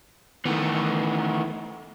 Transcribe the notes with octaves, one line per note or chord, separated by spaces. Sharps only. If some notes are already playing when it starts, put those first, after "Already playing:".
D#3 E3 A3 B3